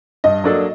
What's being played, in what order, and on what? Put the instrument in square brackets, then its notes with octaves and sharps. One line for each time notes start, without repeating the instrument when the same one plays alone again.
[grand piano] G2 [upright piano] D#5
[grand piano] F#3 A#3 D4 A4